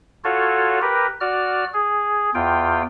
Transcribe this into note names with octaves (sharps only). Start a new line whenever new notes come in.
F4 F#4 A4 C#5
G4 A#4 B4
F#4 D5 F6
G#4
E2 F4 G5